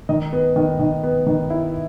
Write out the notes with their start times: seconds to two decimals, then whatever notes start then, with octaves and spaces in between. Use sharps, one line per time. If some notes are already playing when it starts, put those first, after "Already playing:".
0.09 D#3 D#5
0.33 B3
0.56 D#3
0.79 D#3
1.03 B3
1.27 D#3
1.50 E4